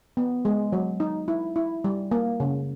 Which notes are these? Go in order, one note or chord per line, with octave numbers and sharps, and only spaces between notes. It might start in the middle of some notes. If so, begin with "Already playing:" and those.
B3
G#3
F#3
D#4
E4
E4
G3
A#3
C#3